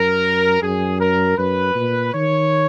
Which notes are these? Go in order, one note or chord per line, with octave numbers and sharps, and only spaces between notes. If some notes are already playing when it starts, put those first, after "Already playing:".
Already playing: F#2 A#4
F#2 G#4
A#4
F#2 B4
A#2
D#3 C#5